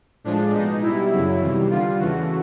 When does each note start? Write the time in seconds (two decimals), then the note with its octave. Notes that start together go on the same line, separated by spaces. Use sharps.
0.24 A2 F3 G#3 D4
0.52 B2 G#3 D#4
0.82 B2 G3 E4
1.11 F#2 C#3 F#3
1.40 E2 C3 D#3 G3
1.70 G2 D3 G3 F4
1.98 E2 C#3 E3 A3 F#4